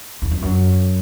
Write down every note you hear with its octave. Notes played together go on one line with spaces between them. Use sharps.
E2
F2
F#2